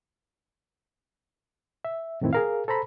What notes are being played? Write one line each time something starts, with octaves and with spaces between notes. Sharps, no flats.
E5
F2 A2 D#3 A3 C4 E4
G#4 A#4 F5
A4 C5 A#5 B5